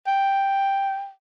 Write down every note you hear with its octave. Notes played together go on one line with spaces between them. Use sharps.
G5